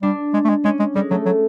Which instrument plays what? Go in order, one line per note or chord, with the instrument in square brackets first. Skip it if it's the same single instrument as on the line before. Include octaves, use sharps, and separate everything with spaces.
[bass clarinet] G3 [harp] D4
[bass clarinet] G#3
A3
G#3
[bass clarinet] G#3 [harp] C#4
[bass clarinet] G#3
[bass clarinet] G3 [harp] G#3
[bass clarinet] F#3 [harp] A3
[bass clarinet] F#3